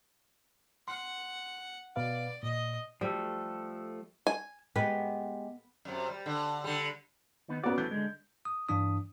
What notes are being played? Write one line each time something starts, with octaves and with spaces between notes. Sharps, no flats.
F#5 C6
B2 B4 D5 F5
A#2 D#5
F3 G3 A3 A4
G#5
G#3 B3 G4
F#2 C3
G3
D3
D3 G3
D#3 B3
B3 C#4 F#4 D5
E3 A3 B3 G6
D3 G#3
D#6
G2 E3 D4 D#6